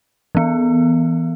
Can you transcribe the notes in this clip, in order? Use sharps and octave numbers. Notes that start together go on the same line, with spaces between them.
E3 B3